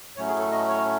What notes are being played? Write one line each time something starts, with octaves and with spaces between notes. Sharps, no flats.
A2 F#3 A3 C#4 C#5
G#4
A4
D#5
C#5